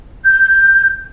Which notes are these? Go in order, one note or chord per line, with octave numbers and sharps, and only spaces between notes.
G6